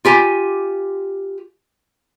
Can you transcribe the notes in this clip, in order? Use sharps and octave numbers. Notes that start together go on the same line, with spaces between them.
F4 G4 G#5